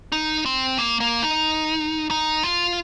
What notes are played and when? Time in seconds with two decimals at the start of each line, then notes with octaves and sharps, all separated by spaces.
0.12 D#4
0.46 C4
0.79 A#3
1.00 A#3
1.23 D#4
2.11 D#4
2.43 F4